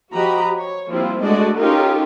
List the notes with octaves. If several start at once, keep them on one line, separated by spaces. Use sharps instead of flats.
F3 F#4 G4 D#5 A#5 B5
C#5
F3 G3 A#3 C4 E4 F4
G#3 A3 D4 F#4 D5 D#5
C#4 D#4 F4 G4 A4 A#4